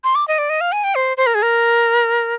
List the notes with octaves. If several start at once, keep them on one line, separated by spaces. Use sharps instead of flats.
C6
D6
D#5
D5
D#5
F5
G#5
G5
C5
C5
A#4
G#4
A#4